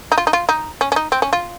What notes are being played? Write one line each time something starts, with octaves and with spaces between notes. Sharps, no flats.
D#4
F4
D#4
F4
D#4
C#4
C#4
D#4
C4
C#4
F4